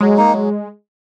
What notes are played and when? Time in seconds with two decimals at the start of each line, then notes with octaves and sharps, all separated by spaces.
0.01 F#3 G#3
0.17 A#3 D#4
0.33 F#3